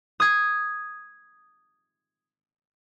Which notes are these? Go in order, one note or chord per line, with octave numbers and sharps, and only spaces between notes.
D#6 G#6